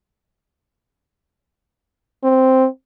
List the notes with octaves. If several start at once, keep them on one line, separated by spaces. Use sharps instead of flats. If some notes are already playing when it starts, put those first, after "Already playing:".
C4